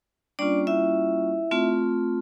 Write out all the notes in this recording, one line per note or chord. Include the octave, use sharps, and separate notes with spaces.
G3 A#3 C#4 D4 F4 D5
E4 E5
A3 C4 F4